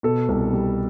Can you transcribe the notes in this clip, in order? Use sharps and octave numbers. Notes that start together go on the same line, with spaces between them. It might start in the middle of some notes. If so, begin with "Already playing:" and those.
B2 A4
C2
G3